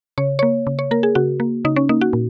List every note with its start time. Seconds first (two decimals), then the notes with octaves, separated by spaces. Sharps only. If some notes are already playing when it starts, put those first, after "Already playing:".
0.18 C#3 C#5
0.39 A#3 C#5
0.67 C#3
0.79 C#5
0.91 A#3 A#4
1.03 G#4
1.15 C#3 F#4
1.40 A#3
1.65 C#3 D#4
1.76 C#4
1.89 A#3 D#4
2.01 F#4
2.13 A#2